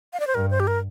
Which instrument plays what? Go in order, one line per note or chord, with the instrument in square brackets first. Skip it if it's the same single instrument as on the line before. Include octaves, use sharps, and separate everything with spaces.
[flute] F5
D5
C5
[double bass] G2 [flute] A#4
[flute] C5
G4
A#4